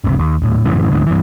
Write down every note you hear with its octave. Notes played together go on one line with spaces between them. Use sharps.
G1 C#2 C3
D#2
D#1 A2
F#2 A2 C#3 E3
D2 G#2 D3
G2 E3